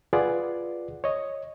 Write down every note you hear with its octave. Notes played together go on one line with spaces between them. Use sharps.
F4 G#4 B4 D5 F#5
C#5 D#5